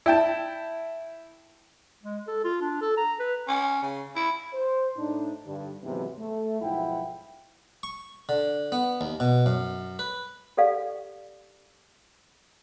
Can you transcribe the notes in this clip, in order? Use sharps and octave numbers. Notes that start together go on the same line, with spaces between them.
E4 G5 A5
G#3
A4
F4
D4
A4
A#5
B4
C#4
C#3
E4
C5
A2 D4 D#4
G2 D3
D#2 G#2 C3 E3 F#3 B3
A3
B1 G#2 F3 E4 F#5 G5
C#6
D3
B3
D#2
B2
F#2
B4
G4 A4 D5 F5